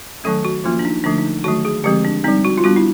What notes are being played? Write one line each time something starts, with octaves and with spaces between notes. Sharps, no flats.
D#3 F#3 A3 C#4 A4
F#4
F3 A#3 C#4 F4
D4
D#4
D3 F3 A3 D4
D#4
D#3 F#3 A3 F#4
G#4
D3 F3 G#3 C4 G4
D4
G3 C4 D#4
F#4
F4
G3 B3 D4 F#4
E4